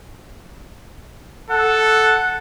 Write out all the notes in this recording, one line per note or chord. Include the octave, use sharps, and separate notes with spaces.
A4 F#5